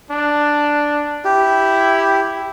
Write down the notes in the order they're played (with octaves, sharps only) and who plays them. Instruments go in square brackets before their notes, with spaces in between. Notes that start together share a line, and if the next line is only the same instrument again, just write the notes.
[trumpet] D4
[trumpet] E4 [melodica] G4